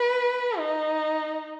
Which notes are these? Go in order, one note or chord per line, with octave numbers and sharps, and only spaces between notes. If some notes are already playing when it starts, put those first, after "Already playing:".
Already playing: B4
D#4